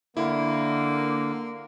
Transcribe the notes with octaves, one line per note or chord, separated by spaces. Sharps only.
D3 A#3 E4